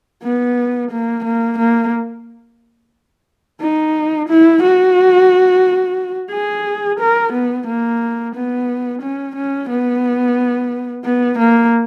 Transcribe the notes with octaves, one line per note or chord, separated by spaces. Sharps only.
B3
A#3
A#3
A#3
D#4
E4
F#4
G#4
A#4
B3
A#3
B3
C#4
C#4
B3
B3
A#3